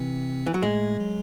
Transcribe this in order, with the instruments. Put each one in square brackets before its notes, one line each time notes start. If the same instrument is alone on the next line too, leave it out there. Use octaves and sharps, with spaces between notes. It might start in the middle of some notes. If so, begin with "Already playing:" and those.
Already playing: [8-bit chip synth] C3 C4 [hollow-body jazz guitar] E3
[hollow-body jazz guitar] E3
F#3
[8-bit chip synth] A2 A3 [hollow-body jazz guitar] G#3
[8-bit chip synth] F#3